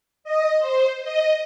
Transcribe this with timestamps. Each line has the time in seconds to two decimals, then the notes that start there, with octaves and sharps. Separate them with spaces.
0.24 D#5
0.59 C5
1.02 D#5